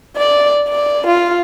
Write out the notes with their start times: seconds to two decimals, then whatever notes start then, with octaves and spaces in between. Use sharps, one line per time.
0.17 D5
0.69 D5
1.07 F4